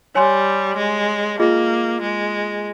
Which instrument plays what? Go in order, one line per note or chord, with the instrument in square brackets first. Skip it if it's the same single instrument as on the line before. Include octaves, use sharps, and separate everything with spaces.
[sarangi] G3 [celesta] C#5 G#5 C6
[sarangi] G#3
[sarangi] A#3 [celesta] F4 G#4 D#5
[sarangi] G#3